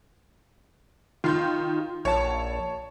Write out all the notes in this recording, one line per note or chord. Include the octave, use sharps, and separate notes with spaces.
D#3 F4 C6 G6
A#1 C#5 A5